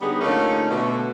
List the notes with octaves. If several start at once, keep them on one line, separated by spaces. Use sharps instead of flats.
D3 F#3 G3 B3 D#4 G#4
D3 A3 A#3 C#4 D#4 F4
B2 D3 A3